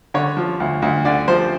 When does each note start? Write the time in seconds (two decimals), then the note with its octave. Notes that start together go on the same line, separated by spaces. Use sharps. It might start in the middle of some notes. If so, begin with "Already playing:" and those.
0.14 D3 C#5
0.37 F3
0.60 D2
0.82 D2
1.05 D3 D5
1.28 F3 C5